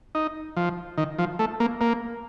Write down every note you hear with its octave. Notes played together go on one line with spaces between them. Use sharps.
D#4
F3
D#3
F3
A3
A#3
A#3